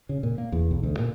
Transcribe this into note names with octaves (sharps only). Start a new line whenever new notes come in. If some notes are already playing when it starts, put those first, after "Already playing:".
C#3
A#2
A#3
E2
B1
D2
A#2